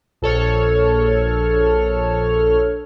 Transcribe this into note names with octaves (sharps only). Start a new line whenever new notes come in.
A#1 A4 C#5 F6